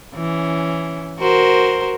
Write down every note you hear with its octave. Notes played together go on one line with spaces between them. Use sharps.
E3 C#4
F#4 A#4 C5